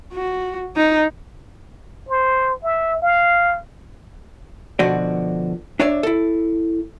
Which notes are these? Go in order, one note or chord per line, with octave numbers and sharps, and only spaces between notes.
F#4
D#4
C5
E5
F5
B2 D3 F3 F#4 D5
D4 C#5 D5 E5
E4 A4